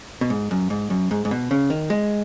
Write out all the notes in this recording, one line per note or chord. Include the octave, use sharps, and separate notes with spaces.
B2
G#2
F#2
G#2
F#2
G#2
G#2
B2
C#3
D#3
G#3